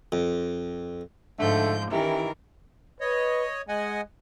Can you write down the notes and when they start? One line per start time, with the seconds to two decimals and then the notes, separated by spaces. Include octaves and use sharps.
0.12 F2
1.39 G#2 D3 F3 A3 A4 G6
1.91 D#3 E3 C#4 E4 G4 A#4
3.01 B4 C#5 D#5
3.69 G#3 D#5 F#5 G#5